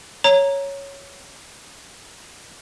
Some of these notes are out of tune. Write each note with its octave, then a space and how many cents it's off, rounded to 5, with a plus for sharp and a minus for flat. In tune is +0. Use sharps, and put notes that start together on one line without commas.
C#5 +0 A#5 +0